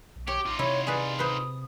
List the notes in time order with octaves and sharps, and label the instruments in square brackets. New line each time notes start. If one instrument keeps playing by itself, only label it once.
[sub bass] B1
[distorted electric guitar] G4 [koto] C#5 [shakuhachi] D6
[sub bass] A1 [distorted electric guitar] D#4 F4
[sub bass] C3 [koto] E4 [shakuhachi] C#5
[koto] G#4 B4 [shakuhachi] D5
[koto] B4 C5 [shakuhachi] D#6